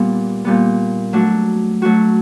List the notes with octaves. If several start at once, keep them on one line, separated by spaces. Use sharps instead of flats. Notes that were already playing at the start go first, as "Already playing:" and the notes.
Already playing: A#2 G3 B3
A#2 G3 B3
F#3 A3 D4 F#4
F#3 A3 D4 F#4